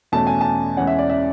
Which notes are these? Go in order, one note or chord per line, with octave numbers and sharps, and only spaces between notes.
E2 B2 A3 C#4 A5
G#5
A5
E2 C#3 E3 G#3 C#4 F#5
E5
D5
E5